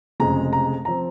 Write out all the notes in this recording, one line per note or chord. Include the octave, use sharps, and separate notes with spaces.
F1 F2 C#3 G#3 A#5
A#5
F3 C4 A#5